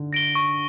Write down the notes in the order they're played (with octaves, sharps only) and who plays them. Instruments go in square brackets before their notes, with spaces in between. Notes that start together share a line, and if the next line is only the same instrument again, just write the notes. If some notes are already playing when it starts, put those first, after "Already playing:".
Already playing: [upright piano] D3
[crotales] A#6 D7 G7
C#6